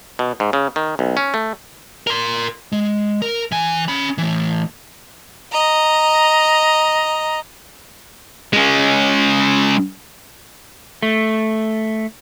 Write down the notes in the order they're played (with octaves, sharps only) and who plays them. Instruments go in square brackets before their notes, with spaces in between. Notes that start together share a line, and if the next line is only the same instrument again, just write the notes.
[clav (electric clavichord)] B2
G#2
C#3
D#3
B1
C#4
A3
[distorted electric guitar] A#4 C6
G#3
A#4
E3 G#5
C#4 B5
E3 A3
[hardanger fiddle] D#5 A#5
[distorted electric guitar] G#3 C#4
[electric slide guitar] A3